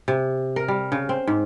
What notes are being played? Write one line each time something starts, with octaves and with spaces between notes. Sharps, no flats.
C3
A#4
G3
C#3
C4
G#2